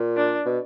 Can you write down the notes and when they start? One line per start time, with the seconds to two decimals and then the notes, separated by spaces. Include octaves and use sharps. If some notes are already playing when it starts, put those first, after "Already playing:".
Already playing: A#2
0.17 D4
0.46 B2